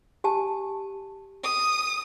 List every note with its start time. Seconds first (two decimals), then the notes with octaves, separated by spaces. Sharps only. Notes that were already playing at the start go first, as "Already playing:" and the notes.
0.24 G4 G#5 A5
1.44 D#6